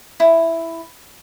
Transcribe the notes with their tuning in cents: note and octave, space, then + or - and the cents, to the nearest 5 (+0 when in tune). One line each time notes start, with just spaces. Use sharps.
E4 +5